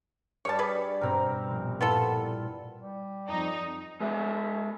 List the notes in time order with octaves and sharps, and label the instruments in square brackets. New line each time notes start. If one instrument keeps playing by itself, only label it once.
[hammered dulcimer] G2 G3 [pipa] C#5 A5
[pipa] G#4 B4 [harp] C#6
[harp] G2 B2 G5 [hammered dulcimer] C4 A#4
[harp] A#1
[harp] G2 A#2 E4 [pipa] B3 F4 A4
[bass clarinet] G3
[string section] F2 D#4
[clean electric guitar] G#3 G#4 B4 E5